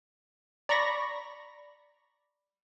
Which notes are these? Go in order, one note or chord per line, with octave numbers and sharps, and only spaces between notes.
D5 A#5 B5 C#6 A#6